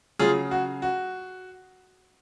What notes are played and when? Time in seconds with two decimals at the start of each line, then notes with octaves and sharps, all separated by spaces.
0.19 C#3 F#3 F4 G#4
0.51 F#4
0.82 F#4